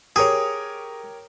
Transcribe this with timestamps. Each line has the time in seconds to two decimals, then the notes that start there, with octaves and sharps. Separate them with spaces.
0.16 G4 G#4 A#4 C#5